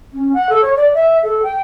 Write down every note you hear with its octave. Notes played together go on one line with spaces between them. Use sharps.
C#4
F#5
A4
C#5
D5
E5
A4
G5